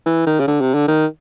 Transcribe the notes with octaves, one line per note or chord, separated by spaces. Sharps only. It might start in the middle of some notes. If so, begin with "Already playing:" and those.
E3
D#3
C#3
D3
C3
D3
D#3